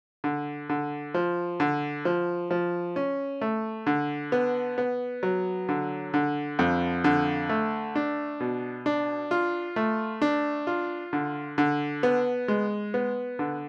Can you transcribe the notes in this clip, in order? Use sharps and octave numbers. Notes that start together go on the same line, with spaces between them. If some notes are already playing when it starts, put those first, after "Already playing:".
D3
D3
F3
D3
F3
F3
C#4
A3
D3
B3
B3
F#3
D3
D3
F2
D3
A3
D4
B2
D4
F4
A3
D4
F4
D3
D3
B3
G#3
B3
D3